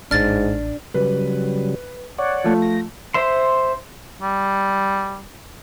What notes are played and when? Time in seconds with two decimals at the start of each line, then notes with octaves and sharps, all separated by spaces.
0.11 A1 G#2 D4 F6 A6
0.94 C#3 F#3 G3 B4
2.18 C#5 D5 F#5
2.44 F3 A3
2.62 A#6
3.14 C5 E5 C6
4.22 G3